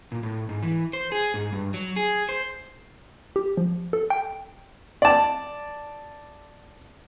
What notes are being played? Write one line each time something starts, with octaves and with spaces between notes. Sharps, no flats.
A#2
A2
G#2
E3
C5
G#4
G#2
G2
F#3
G#4
C5
G4
F3
A4
G5
D5 A5